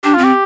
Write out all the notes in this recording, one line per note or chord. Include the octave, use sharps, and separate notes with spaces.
D4 G4
C4 F4
G4